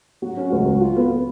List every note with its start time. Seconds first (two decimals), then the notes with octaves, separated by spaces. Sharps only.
0.22 F#3 F#4
0.37 C#4
0.52 C#2 F#4
0.66 C#2
0.81 F4 F#4
0.97 B3
1.11 B3